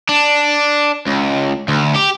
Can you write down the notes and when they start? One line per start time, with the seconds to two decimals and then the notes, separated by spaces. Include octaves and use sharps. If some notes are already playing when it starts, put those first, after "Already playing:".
0.09 D4
1.07 C#2
1.68 D2
1.96 G4